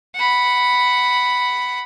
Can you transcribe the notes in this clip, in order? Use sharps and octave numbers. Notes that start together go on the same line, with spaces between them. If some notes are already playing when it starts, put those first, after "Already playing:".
F#5 B5